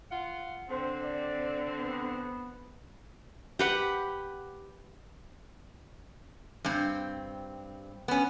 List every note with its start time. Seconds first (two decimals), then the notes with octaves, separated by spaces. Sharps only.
0.11 F4 F#5
0.69 D3 C4 C5
1.04 D5
1.80 B3
3.59 G4 B4 F#5
6.64 G2 C4
8.08 B3 C#4